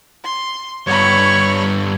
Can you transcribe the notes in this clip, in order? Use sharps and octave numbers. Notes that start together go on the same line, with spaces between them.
C6
G2 B3 C#5 B5 C#6